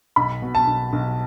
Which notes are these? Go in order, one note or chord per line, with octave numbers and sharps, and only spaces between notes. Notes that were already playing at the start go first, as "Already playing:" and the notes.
B1 B5
B2
A5
B1
B1